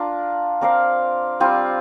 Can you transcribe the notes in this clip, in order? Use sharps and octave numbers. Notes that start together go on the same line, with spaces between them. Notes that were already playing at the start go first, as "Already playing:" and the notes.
Already playing: D4 F4 A#4 D5
C4 A#4 D5 F5
G3 C4 F4